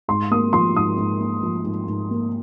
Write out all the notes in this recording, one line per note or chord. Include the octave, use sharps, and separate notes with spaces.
G#2 C6
A#3 D#6
F3 C6
G#2 D#6
G#2
A#3
F3
G#2
G#2
A#3